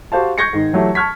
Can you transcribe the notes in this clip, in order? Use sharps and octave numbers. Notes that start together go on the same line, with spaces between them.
F#4 G4 C5 F5 A5
C#6 G6 G#6 A#6 C7 C#7
G#2 D#3
E3 F#3 A3 G4 E5
A5 C#6 F6 G#6 B6